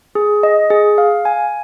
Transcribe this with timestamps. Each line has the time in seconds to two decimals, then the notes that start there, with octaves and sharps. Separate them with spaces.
0.15 G#4
0.43 D#5
0.70 G#4
0.98 F5
1.25 G#5